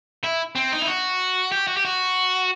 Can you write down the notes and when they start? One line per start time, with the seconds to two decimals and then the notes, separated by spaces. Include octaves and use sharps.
0.24 E4
0.55 C4
0.72 D#4
0.82 E4
0.87 F#4
1.52 G4
1.67 F#4
1.77 G4
1.85 F#4